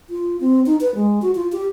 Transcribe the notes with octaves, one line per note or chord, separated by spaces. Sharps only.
F4
C4
D#4
B4
G#3
F#4
F4
G4